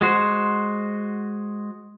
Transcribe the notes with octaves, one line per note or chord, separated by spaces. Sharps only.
G#3 F#4 C5